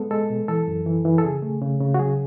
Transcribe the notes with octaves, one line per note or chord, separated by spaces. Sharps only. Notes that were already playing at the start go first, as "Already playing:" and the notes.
Already playing: G#3 B3 A4
G#3 A4
B2
E3 A4
F#2
E3
E3
A4
C#3 G#4
A3
C#3
C#3
F#4
F#3 G#4